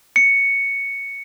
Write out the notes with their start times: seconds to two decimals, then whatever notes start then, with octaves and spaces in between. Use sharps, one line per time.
0.16 C#7